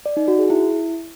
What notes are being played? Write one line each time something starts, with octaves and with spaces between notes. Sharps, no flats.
D5
D#4
F#4
G#4
E4